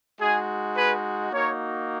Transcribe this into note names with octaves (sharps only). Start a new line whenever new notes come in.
G#3 D#4 F#4 G#4
G#4 B4
A#3 D#4 F#4 A#4 C#5